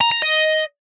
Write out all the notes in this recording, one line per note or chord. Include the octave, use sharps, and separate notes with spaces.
A#5
A#5
D#5